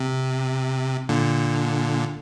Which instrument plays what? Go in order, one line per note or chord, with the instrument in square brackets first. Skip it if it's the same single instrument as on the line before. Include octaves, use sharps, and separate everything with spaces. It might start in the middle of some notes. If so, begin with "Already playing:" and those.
Already playing: [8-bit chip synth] C3
A#2 D3